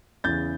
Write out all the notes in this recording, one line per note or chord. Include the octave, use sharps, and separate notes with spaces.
E2 C#3 E3 G6 A6